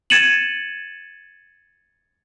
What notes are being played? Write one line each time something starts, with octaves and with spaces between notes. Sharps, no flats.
G#6 A6 C#7 D#7 E7 F#7